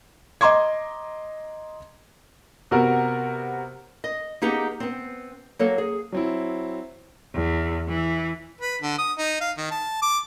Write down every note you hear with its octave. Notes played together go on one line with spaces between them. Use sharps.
D#5 A#5 C6 D6 G#6
C3 B3 F#4 A#4
D#5
A#3 B3 D#4 G4 G#4 F#5
B3 C4
F#3 A#3 A4
G#4
F#3 C4 E4
E2
E3
B4
D3
D#6
D#4
F5
D#3
A5
D6